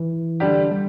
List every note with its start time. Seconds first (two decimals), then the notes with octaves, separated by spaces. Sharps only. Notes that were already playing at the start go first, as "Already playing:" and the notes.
Already playing: E3
0.40 D3 G3 D4 G4
0.71 G3